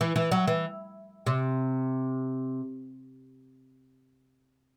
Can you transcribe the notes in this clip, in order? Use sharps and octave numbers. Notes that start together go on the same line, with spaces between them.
E3
E3
F#3
E3
C3